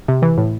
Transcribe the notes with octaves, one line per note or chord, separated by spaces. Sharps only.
C3
E3
A2